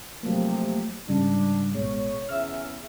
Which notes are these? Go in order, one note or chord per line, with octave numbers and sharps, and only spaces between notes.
C3 F3 F#3 A3 A#3
G#2 C#3 G3 D4
A1 B2 G#3 C#5
E2 C#3 E5 E6 F6